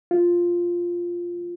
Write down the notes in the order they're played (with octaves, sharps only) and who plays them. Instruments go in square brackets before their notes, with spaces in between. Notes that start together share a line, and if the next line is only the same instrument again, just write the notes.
[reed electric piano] F4